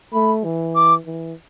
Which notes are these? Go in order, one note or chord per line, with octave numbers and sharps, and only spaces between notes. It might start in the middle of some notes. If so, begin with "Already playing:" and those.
A3 B5
E3
D6
E3